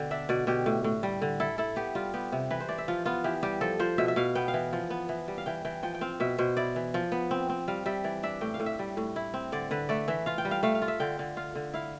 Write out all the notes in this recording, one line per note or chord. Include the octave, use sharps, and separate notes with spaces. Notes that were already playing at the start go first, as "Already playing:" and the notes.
Already playing: B2 D3 G5
D4 E5
B2 D5
B2 G4
A2
A2
G3
D3
E4 A4
E4 A4
B3 G4
G3 F4
B3 G4
C3
E3 B4
C5
E3 D5
E5
F3 F4
B3 F4
E3 G4
G3 G4
F3 A4
F3 C5
B2 E5
E5
B2 F5
B3 G5
F5
E3
F3
B3
E3
G3
F5
E3 G5
E3 G5
F3 G5
G5
C4 F5
B2 E5
B2 C5
E4 D5
E3
F3
B3
C4
C4
G3 F5
G3 E5
E3 D5
D4 E5
A2 G5
F5
A2
E5
G3
A2
E4
C4
D3 D5
D3 B4
A3 D5
E3 E5
F4 F5
G5
G3
F5
A3 F5
F5
F4
E5
D3 G5
D3
F4 F5
D3
E4 F5